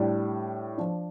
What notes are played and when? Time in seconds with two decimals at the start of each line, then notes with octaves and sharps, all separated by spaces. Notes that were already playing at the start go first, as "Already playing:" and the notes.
Already playing: A2 G3 D4
0.78 F3 D4